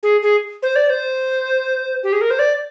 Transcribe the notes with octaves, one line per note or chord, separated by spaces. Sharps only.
G#4
G#4
C5
D5
C5
G4
G#4
A#4
C5
D5